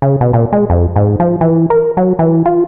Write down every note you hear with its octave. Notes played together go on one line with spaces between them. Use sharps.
C#3
B2
A#2
G#3
F2
G#2
F3
E3
A#4
F#3
E3
F4